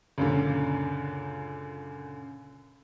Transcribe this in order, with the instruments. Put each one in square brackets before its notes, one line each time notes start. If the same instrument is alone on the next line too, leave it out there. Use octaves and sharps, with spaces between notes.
[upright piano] C#2 F#2 A#2 D3